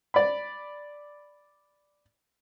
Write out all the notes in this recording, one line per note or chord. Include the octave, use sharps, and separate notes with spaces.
D5 B5